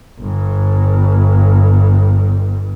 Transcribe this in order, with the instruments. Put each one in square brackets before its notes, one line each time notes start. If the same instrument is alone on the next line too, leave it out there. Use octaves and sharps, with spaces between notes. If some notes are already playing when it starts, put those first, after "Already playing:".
[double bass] G1 G2